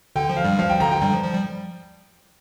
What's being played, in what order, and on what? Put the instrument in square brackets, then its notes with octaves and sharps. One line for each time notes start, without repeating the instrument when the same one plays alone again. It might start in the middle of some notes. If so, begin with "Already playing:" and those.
[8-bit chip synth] D3 [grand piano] G5
[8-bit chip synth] F3
[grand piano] F5
[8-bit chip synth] G2 G3
[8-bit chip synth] F3 [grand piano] F5
[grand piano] G5
[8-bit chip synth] D3 [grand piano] A#5
[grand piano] G5
[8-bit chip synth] G2 G3
F3
F3
G3